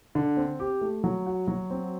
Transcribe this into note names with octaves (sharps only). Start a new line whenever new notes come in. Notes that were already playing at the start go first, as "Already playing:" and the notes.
D3
C4
G4
A3
F#3
F#4
F#3
C4